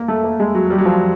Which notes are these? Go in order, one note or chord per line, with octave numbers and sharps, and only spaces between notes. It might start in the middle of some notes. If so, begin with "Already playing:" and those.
Already playing: A#3
A3
A#3
G#3
F#3
G3
F#3
F3